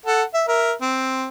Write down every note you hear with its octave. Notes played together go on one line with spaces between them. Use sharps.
A4 F#5
E5
A#4 E5
C4